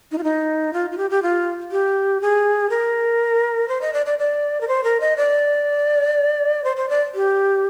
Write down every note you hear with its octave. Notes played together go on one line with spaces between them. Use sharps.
D#4
F4
D#4
F4
F4
G4
G4
F4
G4
G#4
A#4
C5
D#5
D5
D5
D5
A#4
C5
A#4
D#5
D5
C5
C5
D5
G4